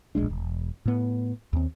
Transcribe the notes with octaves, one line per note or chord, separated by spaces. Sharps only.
D1 A#1 G#3 D4
E1
A2 B3
D#2 C4